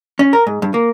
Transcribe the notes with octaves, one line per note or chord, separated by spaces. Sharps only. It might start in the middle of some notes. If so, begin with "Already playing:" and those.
C#4
A#4
G#2
G2
A#3